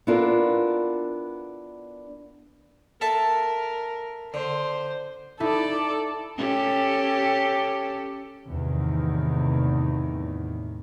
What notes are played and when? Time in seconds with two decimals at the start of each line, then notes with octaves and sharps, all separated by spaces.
0.07 B3 D4 E4 F4 A4 A#4
3.01 A4 A#4 E5 A5
4.34 D3 C5
5.40 D#4 E4 A4 D5
6.38 C#4 G4 A4
8.49 E2 A2 C3 D#3